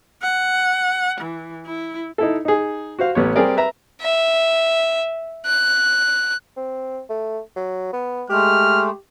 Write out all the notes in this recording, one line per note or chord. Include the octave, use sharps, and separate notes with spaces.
F#5
E3
E4
D#4 E4 A4
D#4 G#4
F#4 C5 F5
A1 B3 C#5
G3 C4 G4 G#4 A#4 D5
B4 E5 A#5
E5
F#6
C4
A3
F#3
B3
G#3 A3 G4 F6